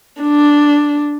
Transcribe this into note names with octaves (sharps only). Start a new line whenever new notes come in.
D4